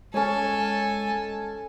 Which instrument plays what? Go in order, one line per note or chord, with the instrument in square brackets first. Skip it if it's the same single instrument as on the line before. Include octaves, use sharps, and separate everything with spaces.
[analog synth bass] G#3 [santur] C#4 C#5 [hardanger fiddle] A4 [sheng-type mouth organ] G#5